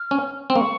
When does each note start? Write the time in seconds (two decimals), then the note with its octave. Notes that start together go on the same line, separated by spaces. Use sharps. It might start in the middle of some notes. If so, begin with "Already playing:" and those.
Already playing: F6
0.11 C#4
0.50 C4
0.56 A#3 C#6